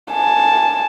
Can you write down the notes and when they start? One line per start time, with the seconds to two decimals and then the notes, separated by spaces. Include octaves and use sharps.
0.12 G#5 A5